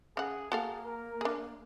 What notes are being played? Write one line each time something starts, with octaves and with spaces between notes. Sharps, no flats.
C#3 G#4 F#5
A#3 F#4 G#4 A4 F5
A#4
D4 G#4